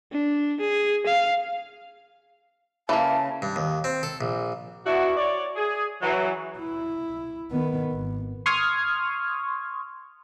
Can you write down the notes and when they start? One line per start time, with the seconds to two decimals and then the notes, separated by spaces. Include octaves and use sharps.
0.12 D4
0.60 G#4
1.06 F5
2.89 C#3 E3 A#3 A5
3.42 G2
3.56 D#2
3.84 C4
4.03 A4
4.21 A#1
4.86 B3 D4 E4 F#4
5.17 C#5 D5
5.56 G#4
6.02 E3 F#3
6.58 E4
7.51 D#3 B3
7.92 G#1
8.46 C6 C#6 D#6 F6 G#6